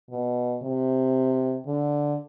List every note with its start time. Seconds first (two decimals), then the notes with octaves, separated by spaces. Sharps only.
0.10 B2
0.62 C3
1.67 D3